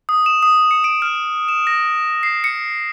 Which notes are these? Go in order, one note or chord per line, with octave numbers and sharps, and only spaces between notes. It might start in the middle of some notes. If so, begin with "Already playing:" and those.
D#6
E7
D#6
C#7
D7
F6
E7
A#6
C7
C#7